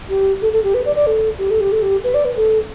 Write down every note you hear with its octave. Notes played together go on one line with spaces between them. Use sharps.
G4
A4
A4
G4
B4
D5
D5
A4
G4
A4
G4
A4
G4
B4
D5
B4
A4